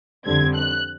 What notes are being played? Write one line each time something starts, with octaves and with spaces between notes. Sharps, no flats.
F2 D3 G3 C4 G#6
F#6